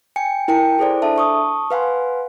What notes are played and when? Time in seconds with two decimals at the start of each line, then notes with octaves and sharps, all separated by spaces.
0.16 G5 G#5 C#7
0.48 E4 A#4 G5 A5 C#7
0.78 E4 G#4 A4 C5 D5
1.02 D4 A4 E5 A5
1.16 A5 C#6 D#6
1.71 B4 F5 F#5 G#5 C6